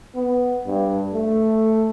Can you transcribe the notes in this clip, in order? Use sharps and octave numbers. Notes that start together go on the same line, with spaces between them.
B3
G2
A3